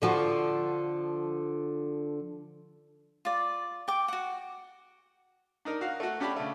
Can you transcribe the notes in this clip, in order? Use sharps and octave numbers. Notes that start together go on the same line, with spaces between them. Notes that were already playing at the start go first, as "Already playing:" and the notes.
D3 F3 F#4
F4 D5
G5 D6
F#4 F#5
D4 D#4 A#4
F#4 F5
A3 F#4
C#4 D4 G4 D5 A5 B5
C#3 A3